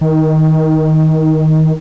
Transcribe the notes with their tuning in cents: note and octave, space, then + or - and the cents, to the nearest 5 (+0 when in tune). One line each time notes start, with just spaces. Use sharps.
D#3 +15